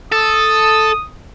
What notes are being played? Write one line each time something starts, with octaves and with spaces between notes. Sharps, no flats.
A4 D#6